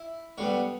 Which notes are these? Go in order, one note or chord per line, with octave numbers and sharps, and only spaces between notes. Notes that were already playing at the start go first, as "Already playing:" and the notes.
Already playing: E4
D3 G3 B3 C#5